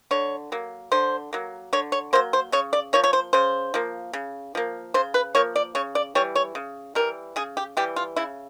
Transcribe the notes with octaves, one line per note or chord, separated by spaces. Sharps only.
D3 C#5
F#3 A#3
D3 C5
F#3 A#3
D3 C#5
C#5
F#3 A#3 C5
C5
C#3 C#5
D5
F3 A#3 C#5
C#5
C5
C#3 C5
F3 A#3
C#3
F3 A#3
C#3 C5
B4
F3 A#3 C#5
D5
C#3 C#5
D5
E3 G3 C#5
C#5
C#3
E3 G3 A#4
C#3 G#4
G4
E3 G3 G4
F4
C#3 E4